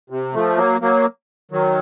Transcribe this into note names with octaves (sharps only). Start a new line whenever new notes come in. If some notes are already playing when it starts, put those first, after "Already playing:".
C3
F3 A3
F#3 A#3
F#3 A#3
D#3 F#3